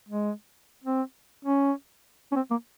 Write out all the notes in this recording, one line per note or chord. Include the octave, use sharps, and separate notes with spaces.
G#3
C4
C#4
C#4
C4
A#3